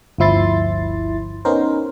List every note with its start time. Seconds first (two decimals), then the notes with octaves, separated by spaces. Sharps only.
0.18 G1 D2 F3 E4 C6 A6
1.45 B3 C#4 D#4 A#4 C5